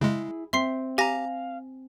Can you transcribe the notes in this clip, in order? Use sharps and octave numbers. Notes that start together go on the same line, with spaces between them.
C#3 G#3 E4 G#4
C4 E5 C6 C7
G4 F5 G#5 A#5 A#6